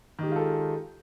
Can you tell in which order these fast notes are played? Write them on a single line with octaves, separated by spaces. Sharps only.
D#3 G4 G#3 F4 A4